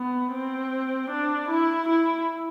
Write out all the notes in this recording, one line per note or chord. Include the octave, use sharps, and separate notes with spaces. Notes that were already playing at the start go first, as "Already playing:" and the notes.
Already playing: B3
C4
D4
E4
E4